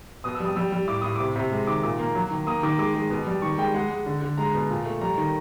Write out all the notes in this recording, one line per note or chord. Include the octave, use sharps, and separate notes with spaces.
B2 D#6
E6
G3
D#6
G3 E6
G3
A2 D6
A2 D#6
C3 D6
C3
G#3
D#3 D6
A#2 D6
A#3
F#3
D#3
A#3 D#6
D#3 D6
G#3 D6
G#3
B2
G3
D#3 C#6
G#3 G5
G#3 F#5
G#3
D3
D3
G#3 A#5
B2
A#2
A3
G3 A#5
D#3